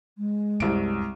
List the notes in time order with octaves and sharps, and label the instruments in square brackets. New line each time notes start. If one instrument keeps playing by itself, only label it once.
[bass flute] G#3
[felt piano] C2 D7 [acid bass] F#2